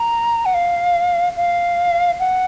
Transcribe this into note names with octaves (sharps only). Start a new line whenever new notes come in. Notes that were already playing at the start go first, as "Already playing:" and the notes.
Already playing: A#5
F#5
F5
F5
F#5